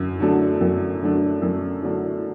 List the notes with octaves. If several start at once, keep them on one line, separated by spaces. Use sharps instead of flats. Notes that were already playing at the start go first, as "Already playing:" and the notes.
Already playing: F#2 D3
D3 F#3 A3 D4
F#2
D3 F#3 A3 D4
F#2
D3 F#3 A3 D4